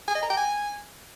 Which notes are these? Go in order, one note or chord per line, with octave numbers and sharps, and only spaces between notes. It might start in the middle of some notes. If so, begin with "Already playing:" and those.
G#5
D#5
A#5
G5
G#5